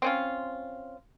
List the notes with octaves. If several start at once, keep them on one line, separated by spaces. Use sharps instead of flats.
C4 C#4 F4